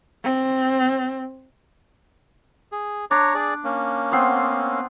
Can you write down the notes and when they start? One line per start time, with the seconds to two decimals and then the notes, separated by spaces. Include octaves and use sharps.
0.24 C4
2.72 G#4
3.11 D4 C#5 A#5
3.34 G#4 D5
3.64 A#3 C#4
4.12 B3 C4 C6